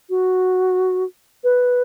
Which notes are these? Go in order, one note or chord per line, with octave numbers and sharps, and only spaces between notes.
F#4
B4